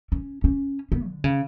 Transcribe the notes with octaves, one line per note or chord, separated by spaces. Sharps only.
C#4
C#4
B3
D3
C#3